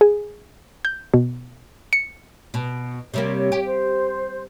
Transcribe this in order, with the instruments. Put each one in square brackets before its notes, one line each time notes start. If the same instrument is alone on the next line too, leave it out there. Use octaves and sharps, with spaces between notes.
[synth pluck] G#4
G6
B2
C#7
[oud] B2
[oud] C3 G3 A#3 [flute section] C#5
[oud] G4
[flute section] C5